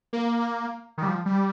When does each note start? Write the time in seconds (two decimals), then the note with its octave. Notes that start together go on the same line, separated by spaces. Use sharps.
0.13 A#3
0.98 D#3
1.03 G3
1.08 F3
1.26 G3